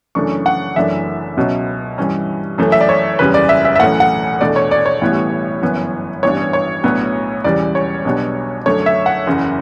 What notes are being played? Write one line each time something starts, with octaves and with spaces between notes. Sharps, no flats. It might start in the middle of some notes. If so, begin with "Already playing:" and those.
F#2 C#3 E3 A3 D4 C#6
F#5
F#1 F#2 E3 A3 D4 E5
C#2 B2 F#3 C#4
G2 E3 G3 C#4
F#2 E3 A3
E5
D5
C#5
F#1 E2 C#3 G3 B4
D5
E5
E5
E5
B1 A2 E3 A3 C#4 F#5
F#5
E2 B2 A3 D4 D5
C#5
D5
C#5
A1 A2 E3 G3 B3
G1 F#2 E3 B3
A1 G2 E3 B3 D4 C#5
C#5
B1 A2 F#3 B3 D4
E1 E2 C#3 E3 G3 D5
C#5
B1 B2 G3 B3 D4
F#2 D3 A3 D4 C#5
E5
F#5
F#1 E2 C#3